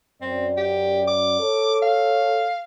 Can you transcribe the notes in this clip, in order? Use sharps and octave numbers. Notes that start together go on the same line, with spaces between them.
F#2 C4 D5
G4
D6
A4 C#5
F5